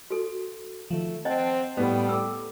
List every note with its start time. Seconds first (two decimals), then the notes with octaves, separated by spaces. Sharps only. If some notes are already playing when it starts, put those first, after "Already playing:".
0.10 F#4 A4
0.90 D#3 F3 A3
1.25 C4 D#5 F#5 G5 A5
1.77 A2 G3 B3
2.09 A3 D6 E6